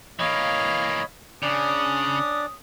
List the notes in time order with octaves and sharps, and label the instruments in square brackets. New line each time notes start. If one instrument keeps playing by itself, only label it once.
[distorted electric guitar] E3 A#3 [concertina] C#5 D#5 B5 [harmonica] F5
[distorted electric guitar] C#3 [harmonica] C#4 D#6 [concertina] D4 D5